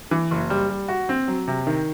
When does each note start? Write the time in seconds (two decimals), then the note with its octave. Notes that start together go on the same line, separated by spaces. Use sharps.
0.11 E3
0.31 F#1
0.50 G3
0.70 G3
0.88 F#4
1.09 C4
1.28 F#3
1.48 C3
1.67 D#3